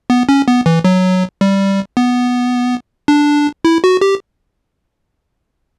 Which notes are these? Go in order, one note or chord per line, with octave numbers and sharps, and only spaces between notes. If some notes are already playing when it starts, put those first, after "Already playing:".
B3
C#4
B3
E3
F#3
G3
B3
D4
E4
F#4
G4